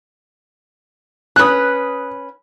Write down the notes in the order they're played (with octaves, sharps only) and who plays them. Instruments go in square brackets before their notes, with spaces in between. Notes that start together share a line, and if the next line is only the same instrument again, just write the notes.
[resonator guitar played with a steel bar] C#4 B4 [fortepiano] D#6 F#6